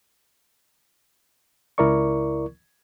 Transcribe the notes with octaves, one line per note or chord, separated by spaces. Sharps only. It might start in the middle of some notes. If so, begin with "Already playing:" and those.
C#2 E4 A#4 D5 C#6